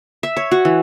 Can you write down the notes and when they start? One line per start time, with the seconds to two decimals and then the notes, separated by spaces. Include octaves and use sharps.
0.23 E5
0.37 C#5
0.51 F#4
0.65 E3